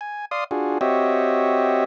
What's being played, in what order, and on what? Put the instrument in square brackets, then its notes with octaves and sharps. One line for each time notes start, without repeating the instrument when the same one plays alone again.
[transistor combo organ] G#5
D5 F5 C6 D#6
D4 F4 F#4 G#4
C4 F#4 G4 C#5 D#5 E5